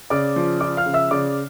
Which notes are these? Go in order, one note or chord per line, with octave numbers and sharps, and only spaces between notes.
C#3 D5 D6
F3
F3 D5 D6
F5 F6
C#3
E5 E6
C#3 D5 D6